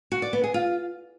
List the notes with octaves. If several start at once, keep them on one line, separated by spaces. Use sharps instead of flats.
F#4
D5
B3
G#4
F4